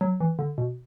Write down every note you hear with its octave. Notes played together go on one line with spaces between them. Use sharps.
F#3
E3
D3
B2